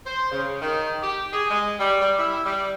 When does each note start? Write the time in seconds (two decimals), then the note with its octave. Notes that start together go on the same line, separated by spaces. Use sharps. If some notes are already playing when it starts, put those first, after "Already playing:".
0.06 C5
0.32 C#3
0.62 D#3
1.02 G4
1.33 G#4
1.50 G#3
1.80 G3
2.01 G3
2.19 E4
2.46 G3